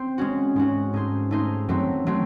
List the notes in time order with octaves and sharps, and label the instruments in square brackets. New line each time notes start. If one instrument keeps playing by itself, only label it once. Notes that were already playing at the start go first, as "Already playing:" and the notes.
Already playing: [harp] C4 C5
G#3 C#4 F#4
[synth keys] G#2 [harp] G#3 C#4 F#4
[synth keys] G#2 [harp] A3 D#4 G#4 C5
[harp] A3 D#4 G#4 C5
[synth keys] F#2 [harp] F#3 A3 C4
[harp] F#3 A3 C4